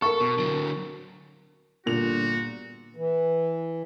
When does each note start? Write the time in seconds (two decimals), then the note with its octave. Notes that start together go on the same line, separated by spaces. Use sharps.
0.02 A4 A#4 C#6
0.20 B2
0.38 D3 F#3
1.86 G1 A#2 F#4 F7
2.96 E3